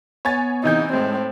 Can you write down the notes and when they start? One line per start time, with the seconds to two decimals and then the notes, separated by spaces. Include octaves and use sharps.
0.25 B3 C#5 G#5 A6
0.64 C3 E3 B3 D#4 G6
0.93 A2 G#3 C4